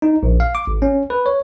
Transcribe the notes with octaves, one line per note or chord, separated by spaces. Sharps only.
D#4
A#1
F5
D6
G#1
C#4
B4
C#5